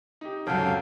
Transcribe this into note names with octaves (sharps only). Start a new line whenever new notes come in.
D#4 G4
G#1 C#2 F#2 A4 F5 G5